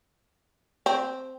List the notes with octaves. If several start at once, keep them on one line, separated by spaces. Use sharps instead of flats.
C4